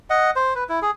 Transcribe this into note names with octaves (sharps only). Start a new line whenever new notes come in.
D#5 F#5
C5
B4
E4
G#4